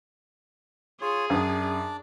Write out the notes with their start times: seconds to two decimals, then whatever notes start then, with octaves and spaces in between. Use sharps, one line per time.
1.01 F4 G#4 C#5
1.30 F#2 D4 D5